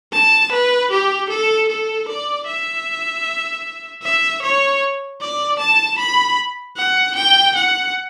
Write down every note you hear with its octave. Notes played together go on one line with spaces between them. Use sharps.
A5
B4
G4
A4
A4
D5
E5
E5
C#5
D5
A5
B5
F#5
G5
F#5